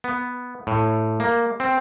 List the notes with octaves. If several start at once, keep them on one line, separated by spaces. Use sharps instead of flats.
B3
A2
A#3
C4